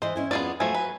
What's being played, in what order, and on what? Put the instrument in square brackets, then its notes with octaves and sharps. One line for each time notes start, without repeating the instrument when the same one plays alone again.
[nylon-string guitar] E3 D#5 [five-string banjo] C5
[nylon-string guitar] C#4 E4 G#5
[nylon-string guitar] F2 F4 [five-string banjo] B3 G#4 D5
[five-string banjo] F3 A3 [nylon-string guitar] F#3 [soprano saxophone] G#5
[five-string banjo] B4